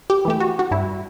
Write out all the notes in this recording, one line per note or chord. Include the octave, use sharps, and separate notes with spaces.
G4
E3 A3 G4
F#4
F#4
G2 E4